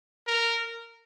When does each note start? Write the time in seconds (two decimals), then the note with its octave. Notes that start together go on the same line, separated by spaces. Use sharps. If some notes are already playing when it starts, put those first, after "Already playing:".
0.27 A#4